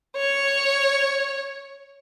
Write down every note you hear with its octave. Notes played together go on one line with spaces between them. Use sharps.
C#5